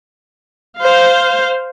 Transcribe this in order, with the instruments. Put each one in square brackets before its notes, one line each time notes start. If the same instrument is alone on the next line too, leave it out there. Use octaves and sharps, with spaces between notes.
[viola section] C5 F5